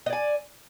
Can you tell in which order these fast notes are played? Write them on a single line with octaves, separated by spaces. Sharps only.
D#5 D5 G#5